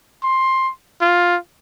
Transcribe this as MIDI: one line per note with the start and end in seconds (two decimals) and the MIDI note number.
0.24 0.70 84
1.01 1.37 65